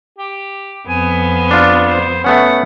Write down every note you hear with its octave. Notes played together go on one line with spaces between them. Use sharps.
G4
F2 B3 G#5
D4 F4
C5
A3 B3 C#4 F#5